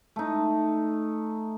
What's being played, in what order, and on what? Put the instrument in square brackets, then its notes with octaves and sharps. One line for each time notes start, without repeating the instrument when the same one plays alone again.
[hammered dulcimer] A3 D#4